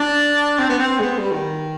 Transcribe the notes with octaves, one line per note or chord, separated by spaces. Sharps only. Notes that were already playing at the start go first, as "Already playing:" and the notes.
Already playing: D4
C4
B3
C4
G#3
B3
G3
D#3